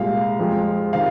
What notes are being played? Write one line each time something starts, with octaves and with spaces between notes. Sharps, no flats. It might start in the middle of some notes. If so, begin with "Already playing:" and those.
Already playing: C2 A#2 G#3 F5
F2 F3 G#3
C3 D#3 F5